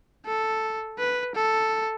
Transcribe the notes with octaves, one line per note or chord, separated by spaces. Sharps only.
A4
B4
A4